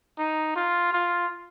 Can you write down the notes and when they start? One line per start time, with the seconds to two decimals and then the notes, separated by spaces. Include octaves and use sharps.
0.18 D#4
0.56 F4
0.93 F4